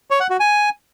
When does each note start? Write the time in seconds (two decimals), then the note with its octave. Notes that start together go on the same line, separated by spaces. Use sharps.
0.11 C#5
0.20 F#5
0.30 F#4
0.40 G#5